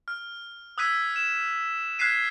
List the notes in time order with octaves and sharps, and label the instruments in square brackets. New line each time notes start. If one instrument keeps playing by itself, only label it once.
[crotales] F6
D#6 E6 F#6 G#6 B6 D#7
E7
F6 F#6 G#6 B6 C7 D#7